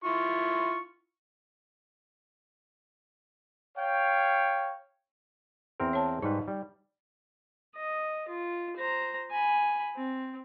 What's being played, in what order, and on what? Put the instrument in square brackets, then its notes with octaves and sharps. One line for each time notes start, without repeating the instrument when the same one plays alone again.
[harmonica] E4 F4 C#6
[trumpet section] C#5 F5 G5
[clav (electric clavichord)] E2 C4 A#4
[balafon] C#5 A5
[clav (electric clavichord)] G#2 G3 B4 [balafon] D#4
[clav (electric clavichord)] G3
[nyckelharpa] D#5
F4
C5 A#5
G#5 B5
C4